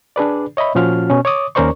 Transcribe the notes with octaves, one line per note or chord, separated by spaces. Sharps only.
D4 G#4 B4 D5
C#5 D#5 E5 B5
A#2 F3 C#4 F4 F#4 F6
B2 C#4
C#5 D6 D#6
D#2 C#4 A#4 C5 D5 C#6